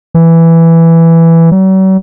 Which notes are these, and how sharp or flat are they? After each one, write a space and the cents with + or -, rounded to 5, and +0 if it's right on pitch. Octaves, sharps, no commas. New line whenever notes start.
E3 +5
F#3 +45